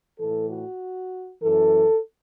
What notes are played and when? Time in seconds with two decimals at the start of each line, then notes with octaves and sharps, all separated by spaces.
0.19 A2 E3 A4
0.49 F#4
1.42 F#2 E3 A4